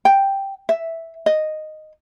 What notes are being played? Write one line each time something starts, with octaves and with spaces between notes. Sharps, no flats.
G5
E5
D#5